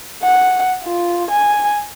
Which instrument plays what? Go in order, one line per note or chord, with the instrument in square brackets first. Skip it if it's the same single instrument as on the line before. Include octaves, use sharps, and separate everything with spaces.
[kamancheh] F#5
F4
G#5